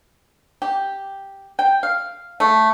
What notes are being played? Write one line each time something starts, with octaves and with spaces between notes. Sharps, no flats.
G4
G5
F5
A3